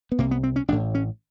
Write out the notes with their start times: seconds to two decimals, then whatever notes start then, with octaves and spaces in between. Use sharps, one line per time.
0.12 B3
0.18 C2 C3 A#3
0.31 B3
0.43 C4
0.56 C#4
0.68 A1 D4
0.72 A2
0.95 C#4